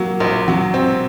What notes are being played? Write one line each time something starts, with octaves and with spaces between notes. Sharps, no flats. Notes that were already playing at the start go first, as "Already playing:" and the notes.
Already playing: F#3 A#3
A#1
F#3
C4